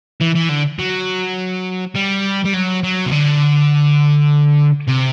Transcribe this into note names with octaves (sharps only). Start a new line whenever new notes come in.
E3
E3
D3
F#3
G3
G3
F#3
F#3
C3
D3
C3